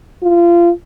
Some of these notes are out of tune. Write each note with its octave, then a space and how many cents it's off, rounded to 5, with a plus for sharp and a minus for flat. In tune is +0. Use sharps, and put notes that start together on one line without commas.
F4 -25